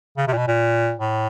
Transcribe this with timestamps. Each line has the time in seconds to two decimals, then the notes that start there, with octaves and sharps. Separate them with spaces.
0.17 C#3
0.28 C3
0.33 A#2
0.38 B2
0.48 A#2
0.99 A2